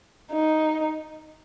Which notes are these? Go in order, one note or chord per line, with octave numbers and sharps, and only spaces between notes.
D#4